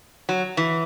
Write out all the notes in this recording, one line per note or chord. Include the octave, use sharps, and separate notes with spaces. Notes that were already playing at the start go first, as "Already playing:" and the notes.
F#3
E3